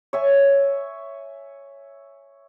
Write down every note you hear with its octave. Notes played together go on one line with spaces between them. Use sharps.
C#5 E5 G#5